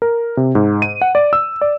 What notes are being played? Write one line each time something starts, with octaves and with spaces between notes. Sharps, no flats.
A#4
C3
G#2
D#7
F#5
D5
E6
D5